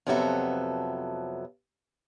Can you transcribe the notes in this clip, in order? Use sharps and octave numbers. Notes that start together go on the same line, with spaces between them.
F2 C3 F#3 B3 A4 E5